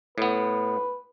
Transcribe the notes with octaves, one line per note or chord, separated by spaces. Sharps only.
A2 B3 B4